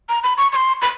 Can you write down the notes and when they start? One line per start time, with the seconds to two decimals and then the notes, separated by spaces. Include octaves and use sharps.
0.09 A#5
0.23 B5
0.38 C#6
0.52 C#6
0.56 C6
0.82 B5